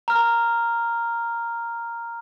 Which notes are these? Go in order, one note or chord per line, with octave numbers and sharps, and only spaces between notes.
A#5 F6